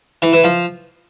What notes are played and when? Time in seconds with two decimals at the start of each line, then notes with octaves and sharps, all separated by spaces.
0.22 E3
0.33 E3
0.44 F3